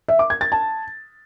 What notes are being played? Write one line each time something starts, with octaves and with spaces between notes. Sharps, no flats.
E5
D6
G#6
A6
A5